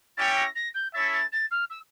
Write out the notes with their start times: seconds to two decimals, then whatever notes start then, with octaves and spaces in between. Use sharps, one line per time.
0.17 C#4 E4 G4 C#5 G5 A6
0.36 A#6
0.55 A#6
0.74 G6
0.93 C#4 E4 A4 C#5 E5 A6
1.13 A6
1.32 A6
1.51 F6
1.70 E6